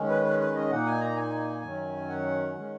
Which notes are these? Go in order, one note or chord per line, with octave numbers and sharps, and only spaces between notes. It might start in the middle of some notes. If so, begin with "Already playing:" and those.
Already playing: D#3 G#3 C#4
B4
B4
B4
D#5
A#2 A#3 D#4 F#5
G#5
A#5
G#5
F#2 D#3 F#3 C#4
F#5
D#3 G#3 C#4